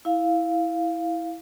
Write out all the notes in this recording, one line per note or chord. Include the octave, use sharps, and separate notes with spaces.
E4 F5